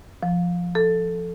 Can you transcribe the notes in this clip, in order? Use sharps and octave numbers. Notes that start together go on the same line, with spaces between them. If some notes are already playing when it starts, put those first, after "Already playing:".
F3
A4